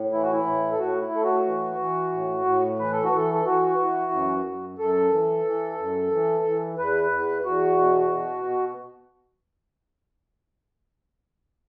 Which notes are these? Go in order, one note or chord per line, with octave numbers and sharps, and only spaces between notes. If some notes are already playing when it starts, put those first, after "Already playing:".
Already playing: A2
E3 E4
F#4
E4
A2
A4
A2 F#4
E4
A2 A4
F#4
E3
E3
A2
A2
E3 B4
A4
F#4
E3 A4
A4
E3 F#4
E3
F#2
F#2
F#2 A4
E3
E3
F#2
E3
E3
E2 B4
E2
E2 F#4
B2
B2
B2